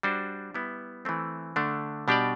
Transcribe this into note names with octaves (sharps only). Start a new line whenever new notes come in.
G3 D4 F#4 C5
G3 B3 E4
E3 A3 C4
D3 A3 D4
B2 G3 D4 G4 D5